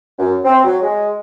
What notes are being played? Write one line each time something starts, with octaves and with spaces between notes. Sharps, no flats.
F#2
C4
F#3
G#3